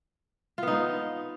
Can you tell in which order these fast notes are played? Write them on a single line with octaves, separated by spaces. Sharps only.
F4 B3 D#4